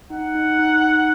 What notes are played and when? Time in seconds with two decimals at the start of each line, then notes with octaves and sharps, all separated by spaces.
0.10 D#4 F#5
0.35 D#4
0.59 D#4
0.82 D#4